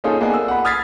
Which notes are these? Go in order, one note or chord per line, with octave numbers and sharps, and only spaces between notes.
A#3 C#4 D#4 F4 G#4 A4
A#3 B3 G#4 D5 D#5 G#5
E6
F#5 B5
D#6 F6 G#6 A6 B6 C7